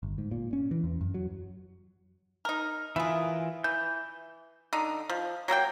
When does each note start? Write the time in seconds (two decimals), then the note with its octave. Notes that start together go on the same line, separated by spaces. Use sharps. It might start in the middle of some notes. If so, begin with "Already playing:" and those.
0.03 G1
0.18 G#2
0.31 A#2
0.53 C#4
0.71 E3
0.84 E2
1.01 F#2
1.14 F#3
2.45 D#4 A#4
2.96 E3 E4 F4 G#4 A#4
3.64 E3 G6
4.73 D3 D#4
5.09 F3
5.48 F#3 A#3 A4 G5